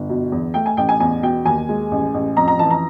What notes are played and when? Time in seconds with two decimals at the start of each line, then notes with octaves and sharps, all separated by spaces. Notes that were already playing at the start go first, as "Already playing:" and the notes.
Already playing: G1
0.09 B2
0.32 E2
0.54 A3 G5
0.66 G#5
0.77 A1 G5
0.89 G#5
1.00 E2 G#5
1.23 B2 G5
1.45 D#2 G#5
1.69 G#3
1.91 A1
2.14 A1
2.36 F2 A#5
2.48 A#5
2.59 E3 A5
2.70 A#5